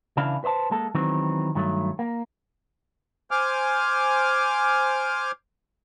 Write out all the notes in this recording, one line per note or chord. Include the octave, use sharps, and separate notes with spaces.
C#3 E3 D4 E4 F5
B4 C5 D#5 A5
G#3 A#3 A4
D#3 E3 F#3 G#3 B3 C4
G2 D#3 F#3 A3
A#3
C5 G#5 D6 F6